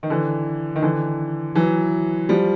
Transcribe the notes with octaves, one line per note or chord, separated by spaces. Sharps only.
D#3
D3 E3
D#3
D3 E3
E3 F#3
F3 G3